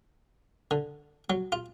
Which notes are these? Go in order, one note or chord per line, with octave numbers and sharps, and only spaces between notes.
D3
F#3
F4